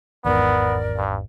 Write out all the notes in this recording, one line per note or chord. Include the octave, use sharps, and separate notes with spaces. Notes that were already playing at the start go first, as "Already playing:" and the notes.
G#1 E2 G#2 B3 A#4 D5
G2